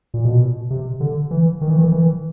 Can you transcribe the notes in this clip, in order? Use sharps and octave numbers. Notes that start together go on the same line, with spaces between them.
A#2
B2
C3
D3
E3
D#3
E3
D#3
E3